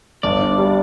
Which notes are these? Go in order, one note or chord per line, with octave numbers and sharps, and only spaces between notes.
G1 D5
G2
G3